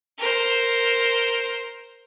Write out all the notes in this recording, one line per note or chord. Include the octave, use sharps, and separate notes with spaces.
A#4 C5